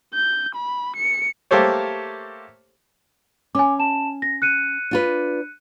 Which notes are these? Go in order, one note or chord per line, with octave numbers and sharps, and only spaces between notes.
G6
B5
C#7
A3 A#3 G4 A4 C5 C#5
C#4 G#5 D6
A5 E7
A#6
F#6 C#7 D#7
D4 F4 B4